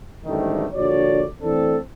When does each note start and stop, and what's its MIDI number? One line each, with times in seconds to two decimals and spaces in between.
0.24 0.66 33
0.24 0.66 44
0.24 0.66 50
0.24 0.66 51
0.24 0.66 55
0.24 0.66 57
0.74 1.25 34
0.74 1.25 50
0.74 1.25 66
0.74 1.25 73
0.74 1.25 74
1.42 1.76 52
1.42 1.76 57
1.42 1.76 60
1.42 1.76 62
1.42 1.76 69